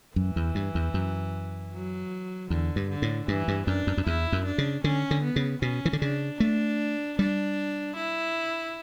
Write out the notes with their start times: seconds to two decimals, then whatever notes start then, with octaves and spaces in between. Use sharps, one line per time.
0.16 F#2 E3
0.36 E2
0.55 G2
0.75 E2
0.94 F#2
1.73 F#3
2.50 E2 D3
2.76 G2
2.89 D3
3.02 A2
3.28 G2 E3
3.48 G2
3.67 F#2 D4
3.87 F#2
3.97 F#2
4.06 E2 E4
4.32 F#2
4.45 D4
4.58 C#3
4.84 D3 C#4
5.11 D3
5.23 B3
5.36 C#3
5.62 B2 C#4
5.85 E3
5.93 D3
6.01 C#3 D4
6.40 A3 D4
7.19 G3 D4
7.96 E4